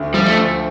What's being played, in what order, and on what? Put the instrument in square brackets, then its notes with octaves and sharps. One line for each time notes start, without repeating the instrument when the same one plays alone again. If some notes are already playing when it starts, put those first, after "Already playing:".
Already playing: [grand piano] D2
[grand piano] F3 [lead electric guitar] G3
[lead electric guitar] A3
[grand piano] D2